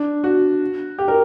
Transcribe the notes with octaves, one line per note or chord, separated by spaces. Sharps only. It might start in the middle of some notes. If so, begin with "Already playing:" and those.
Already playing: D4
F#4
G4
A#4